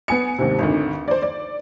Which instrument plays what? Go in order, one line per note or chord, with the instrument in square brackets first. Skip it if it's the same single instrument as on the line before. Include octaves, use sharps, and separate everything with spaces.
[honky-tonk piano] B3 G#5 C#7
D#2 G#2 C3
G#1 D2
C5 D5
D5